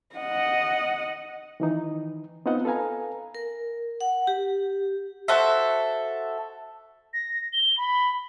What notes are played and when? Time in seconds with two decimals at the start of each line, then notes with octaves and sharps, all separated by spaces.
0.16 D#5 F#5
1.60 D#3 E3 D#4
2.46 B3 C4 D#4 F4 D#5 F#5
2.65 A4 B4 F5 G#5 A#5
3.35 A#4
4.01 F#5
4.27 G4
5.28 F#4 A4 C5 E5
7.14 A#6
7.53 G7
7.78 B5